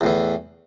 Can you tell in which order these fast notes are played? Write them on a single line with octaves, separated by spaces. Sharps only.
E2 A2 E3